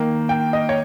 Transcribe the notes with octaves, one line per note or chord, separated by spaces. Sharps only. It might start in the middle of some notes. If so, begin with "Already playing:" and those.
Already playing: D#3 A#3
G5
D#5
C#5